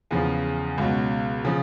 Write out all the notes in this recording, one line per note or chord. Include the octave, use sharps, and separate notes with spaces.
E2 C#3 F3
C#2 B2 F#3
C#3 F3